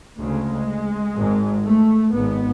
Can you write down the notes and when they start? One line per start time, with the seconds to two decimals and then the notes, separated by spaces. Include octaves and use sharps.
0.19 D2 C#3 G#3
1.16 G#1 G#2
1.64 A3
2.13 G#1 G#2 B3